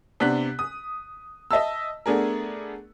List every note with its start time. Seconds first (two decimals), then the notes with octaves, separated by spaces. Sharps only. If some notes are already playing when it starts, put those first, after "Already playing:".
0.20 C3 B3 D4 F#6 B6
0.59 D#6
1.51 D#5 E5 A5 E6
2.06 A3 B3 D4 G#4 A#4